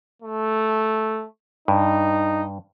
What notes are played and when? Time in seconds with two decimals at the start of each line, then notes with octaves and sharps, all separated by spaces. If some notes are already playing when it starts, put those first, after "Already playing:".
0.22 A3
1.68 G2 D#4